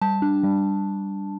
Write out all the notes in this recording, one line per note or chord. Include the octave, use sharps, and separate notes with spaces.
G3 A5
D4
G3